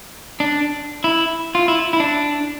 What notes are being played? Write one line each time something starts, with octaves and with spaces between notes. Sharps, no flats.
D4
E4
F4
E4
E4
D4